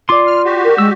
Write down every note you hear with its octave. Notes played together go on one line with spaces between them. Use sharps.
F4 D5 C6 D6
F6
F#4 G4
A#4
G#3 E6